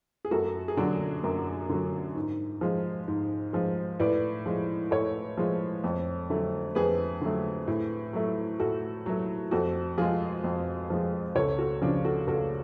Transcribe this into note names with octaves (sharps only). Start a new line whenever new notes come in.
G#4
F#2 F#4 A4
G#4
D3 F#3 D4 F#4
F#2
D3 F#3
G#2
F3 G#3
G#2
F3 G#3
A2 B4 D5
F3 G#3
A2 A4 C#5
F3 G#3
F2
D3 F#3 A3
F2 G#4 B4
D3 F#3 A3
A2
F#3 A3
A2 F#4 A4
F#3 A3
F2 F#4 A4
F3 G#3 F4 G#4
F2
F3 G#3
C#2 A4 C#5
F#4 A4
C#3 F3 D4
F#4 A4
C#2 F#4 A4